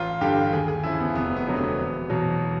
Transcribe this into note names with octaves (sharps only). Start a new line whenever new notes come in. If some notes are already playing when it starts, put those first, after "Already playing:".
Already playing: A1 F4
G2 D3 G4
D#2 G#4
G#4
C#3 F3 E4
B3
F1 B3
B3
F2 D3 F#3 A3
B3
E1
E2 B2 F#3